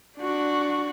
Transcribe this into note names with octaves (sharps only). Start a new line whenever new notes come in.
D4 F#4